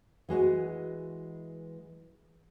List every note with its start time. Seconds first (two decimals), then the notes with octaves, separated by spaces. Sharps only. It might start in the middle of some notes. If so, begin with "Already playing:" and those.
0.29 E3 G#3 F#4 D#5